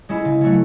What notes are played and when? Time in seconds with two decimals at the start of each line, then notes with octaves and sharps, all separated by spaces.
0.09 G#3 C#4 E4
0.25 C#3
0.41 F#3 A3 C#4